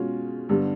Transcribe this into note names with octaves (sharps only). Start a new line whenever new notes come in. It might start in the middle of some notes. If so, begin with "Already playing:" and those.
Already playing: B2 G#3 C#4 F4
G2 D3 G3 B3